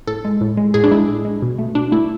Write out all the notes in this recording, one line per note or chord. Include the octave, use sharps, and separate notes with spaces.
A2 A4
G#3
A2
G#3
A2 G#4
D4
G#3 E4
A2
G#3
B2
A3
B2 D4
A3 E4